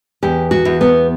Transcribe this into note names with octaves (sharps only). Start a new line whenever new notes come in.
E2 G4
F#4
E2
B3